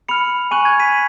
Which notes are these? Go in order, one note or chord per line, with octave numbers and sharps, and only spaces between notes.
B5 F6 C#7 F7
G#5 C#6 F#6 D#7 F#7
G#6
B6 D#7